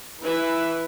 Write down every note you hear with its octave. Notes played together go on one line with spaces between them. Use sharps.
E3 E4 B4 E5